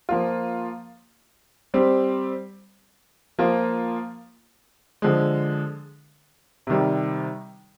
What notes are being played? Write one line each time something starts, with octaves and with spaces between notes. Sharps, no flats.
F3 A#3 F4
G3 C4 G4
F3 A#3 F4
D3 F3 G#3
C3 D#3 G3